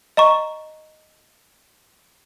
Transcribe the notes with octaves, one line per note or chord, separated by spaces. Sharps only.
D#5 A#5 C#6